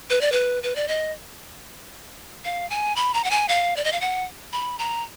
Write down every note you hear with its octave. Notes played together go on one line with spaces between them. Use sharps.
B4
D5
B4
B4
D5
D#5
F5
G#5
B5
A#5
F#5
G#5
F5
D5
D#5
F5
F#5
B5
A#5